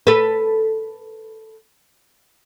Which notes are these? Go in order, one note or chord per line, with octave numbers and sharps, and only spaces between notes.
A4 B4